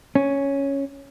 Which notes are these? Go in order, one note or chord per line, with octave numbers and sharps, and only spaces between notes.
C#4